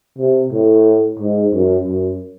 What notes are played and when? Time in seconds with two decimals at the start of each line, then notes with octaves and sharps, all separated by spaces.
0.18 C3
0.52 A2
1.19 G#2
1.53 F#2
1.87 F#2